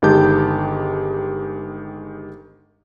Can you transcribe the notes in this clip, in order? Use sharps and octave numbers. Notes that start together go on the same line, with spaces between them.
G1 D#3 G#3 G4 A5 G6